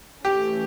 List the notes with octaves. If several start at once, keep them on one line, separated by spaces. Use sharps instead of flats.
E3 A3 C#4 G4